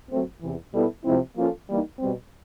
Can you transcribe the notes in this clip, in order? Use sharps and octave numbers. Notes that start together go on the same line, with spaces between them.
F#3 A3 C4
E2 C3 E3
B2 G3 B3 E4 A4
C3 F3 G#3 C4 E4
F3 A#3 C#4 F4 A4
E3 G3 A#3 D#4
B2 G3 C4